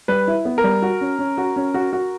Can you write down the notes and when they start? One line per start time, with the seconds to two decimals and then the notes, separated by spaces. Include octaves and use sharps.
0.08 G3 B4
0.28 E4
0.45 B3
0.58 A#4
0.64 G3
0.82 F#4
1.01 C#4
1.19 C#4
1.38 F#4
1.56 C#4
1.74 F#4
1.93 F#4